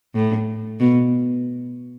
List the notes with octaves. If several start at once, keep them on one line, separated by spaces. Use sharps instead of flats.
A2
B2